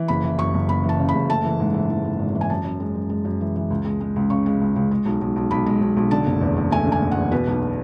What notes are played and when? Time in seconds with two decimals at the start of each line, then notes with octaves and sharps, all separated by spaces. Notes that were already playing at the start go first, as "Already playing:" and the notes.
Already playing: E3
0.08 F#1 B5
0.24 E3
0.38 F#2 C#6
0.54 F#1
0.69 F#1 B5
0.84 E3
0.89 A5
0.99 C#3
1.09 B5
1.14 F#1
1.29 A3 A5
1.45 E3
1.60 G#2
1.74 E3
1.90 E3
2.04 G#2
2.19 G#1
2.35 E3
2.41 G#5
2.50 F#2 A5
2.64 F#2
2.80 G#3
2.95 F#2
3.09 G#3
3.25 F#2
3.41 E3
3.56 E3
3.70 C#2
3.85 G#3
4.01 G#3
4.16 C#2
4.30 C#3 C#6
4.46 G#3
4.61 C#2
4.76 C#2
4.91 G#3
5.05 B1
5.22 B1
5.36 B1
5.51 B1 B5
5.66 G#3
5.81 B1
5.97 B1
6.11 D3 A5
6.27 F#1
6.41 E2
6.57 E2
6.71 A3 G#5
6.87 D3
6.92 G#5
7.02 F#1
7.11 F#5
7.17 E2
7.32 B2 B4
7.47 B1